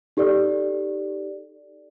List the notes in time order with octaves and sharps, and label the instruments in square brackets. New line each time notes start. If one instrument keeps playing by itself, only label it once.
[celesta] D#4 G4 A4 D5